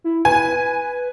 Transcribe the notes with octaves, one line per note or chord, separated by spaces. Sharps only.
E4
B4 G#5